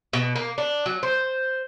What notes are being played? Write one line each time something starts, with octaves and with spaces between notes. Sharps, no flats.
B2
A#3
D4
F#3
C5